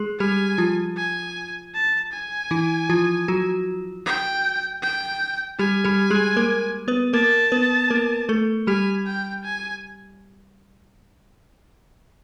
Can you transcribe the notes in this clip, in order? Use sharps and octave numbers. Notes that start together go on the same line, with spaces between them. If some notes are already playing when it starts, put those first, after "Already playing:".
Already playing: G#3 G#4
G3 G4 G#5
F3 F4
G#5
A5
G#5
E3 E4
F3 F4
F#3 F#4
G5
G5
G3 G4 G#5
G3 G4
G#3 G#4
A#3 A#4
B3 B4
A#3 A#4 A5
B3 B4
A#3 A#4
A3 A4
G3 G4 G#5
G5
G#5